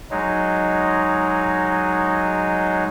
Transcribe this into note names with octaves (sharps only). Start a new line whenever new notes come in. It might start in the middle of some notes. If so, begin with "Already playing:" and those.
F#3 G#3 D#4